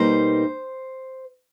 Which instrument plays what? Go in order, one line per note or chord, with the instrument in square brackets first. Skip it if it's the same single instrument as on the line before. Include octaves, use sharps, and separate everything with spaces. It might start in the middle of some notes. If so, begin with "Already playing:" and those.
Already playing: [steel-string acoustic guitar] B2 G3 A#3 D#4 C5